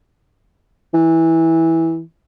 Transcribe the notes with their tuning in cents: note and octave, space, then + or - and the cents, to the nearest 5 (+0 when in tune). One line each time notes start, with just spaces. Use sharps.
E3 -15